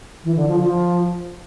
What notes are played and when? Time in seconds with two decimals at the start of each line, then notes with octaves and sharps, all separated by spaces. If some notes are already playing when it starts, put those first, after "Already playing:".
0.24 E3
0.36 D3
0.48 F3
0.60 F3